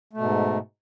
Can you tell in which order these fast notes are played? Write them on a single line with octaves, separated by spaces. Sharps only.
A3 B2 G#2